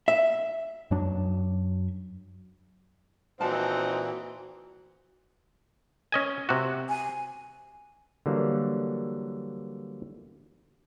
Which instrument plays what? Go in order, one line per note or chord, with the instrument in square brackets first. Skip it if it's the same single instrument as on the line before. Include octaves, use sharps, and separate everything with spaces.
[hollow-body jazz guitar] E5
[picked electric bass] F#2 F#3 D4
[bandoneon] A#2 E3 [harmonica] C4 D#4 F#5 [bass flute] F#4 [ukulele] A5
[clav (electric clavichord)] C#4 D#5 G#5
C3 F#4
[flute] G#5
[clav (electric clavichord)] D3 E3 F#3 G3 A#3